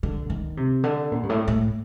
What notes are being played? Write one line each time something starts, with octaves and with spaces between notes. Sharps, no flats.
D3
D#3
C3
D3
A#2
G2
A2
A2